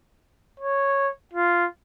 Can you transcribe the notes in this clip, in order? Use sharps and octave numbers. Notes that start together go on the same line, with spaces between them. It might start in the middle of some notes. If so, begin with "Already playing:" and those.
C#5
F4